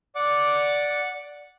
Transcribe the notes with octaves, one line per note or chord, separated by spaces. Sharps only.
D5 F#5 D6